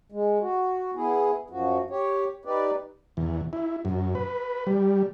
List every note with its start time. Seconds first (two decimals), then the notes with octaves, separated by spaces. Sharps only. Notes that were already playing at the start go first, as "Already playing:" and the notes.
0.12 G#3
0.41 F#4
0.95 B3 E4 G#4
1.50 F#2 F3 F#4
1.90 G4 C#5
2.45 D#4 G4 B4 D5
3.17 E2
3.53 E4
3.85 F#2
4.15 B4
4.67 G3